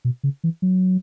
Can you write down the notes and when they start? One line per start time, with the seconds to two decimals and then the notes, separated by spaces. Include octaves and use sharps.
0.05 B2
0.24 C#3
0.44 E3
0.62 F#3